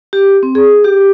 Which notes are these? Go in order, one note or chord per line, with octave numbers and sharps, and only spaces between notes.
G4
C4
G#4
G4